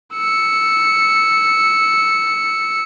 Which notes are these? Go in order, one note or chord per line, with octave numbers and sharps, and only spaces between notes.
E6 C#7